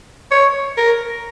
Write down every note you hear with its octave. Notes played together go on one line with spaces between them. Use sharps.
C#5
A#4